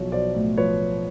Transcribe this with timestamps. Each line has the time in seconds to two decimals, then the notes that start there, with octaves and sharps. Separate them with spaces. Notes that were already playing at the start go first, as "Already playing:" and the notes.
Already playing: B1 F3 C#5
0.12 B1 C5 D5
0.34 A2
0.58 F3 B4 C#5